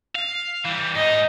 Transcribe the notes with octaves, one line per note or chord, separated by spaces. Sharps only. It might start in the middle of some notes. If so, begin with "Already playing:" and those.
F5
E3 G3
G#2 D#4 D#5